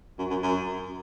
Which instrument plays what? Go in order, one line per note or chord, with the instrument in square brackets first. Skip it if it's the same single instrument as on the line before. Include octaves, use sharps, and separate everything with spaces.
[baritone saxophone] F#2
F#2
F#2